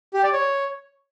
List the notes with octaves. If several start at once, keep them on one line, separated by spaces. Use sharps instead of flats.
G4
D5
C#5